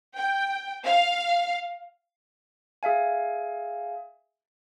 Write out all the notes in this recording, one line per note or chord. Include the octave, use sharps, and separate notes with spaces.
G5
F5
G#4 E5 F5 G#5